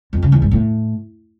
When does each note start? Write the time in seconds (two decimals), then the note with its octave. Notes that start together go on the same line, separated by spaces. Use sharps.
0.13 F2
0.22 C#3
0.32 E2
0.42 G#2
0.51 A2